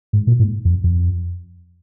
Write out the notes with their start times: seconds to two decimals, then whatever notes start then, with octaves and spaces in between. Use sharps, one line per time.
0.13 G#2
0.27 A#2
0.39 G#2
0.65 F2
0.84 F2